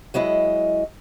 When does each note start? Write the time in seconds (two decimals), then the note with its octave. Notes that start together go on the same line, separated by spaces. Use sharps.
0.14 F#3 G#3 E4 D#5